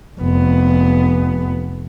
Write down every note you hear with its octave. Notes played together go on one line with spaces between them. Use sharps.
F1 B3